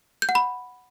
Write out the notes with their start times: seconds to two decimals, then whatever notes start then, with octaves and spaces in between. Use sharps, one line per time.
0.22 G6
0.29 F#5
0.35 B5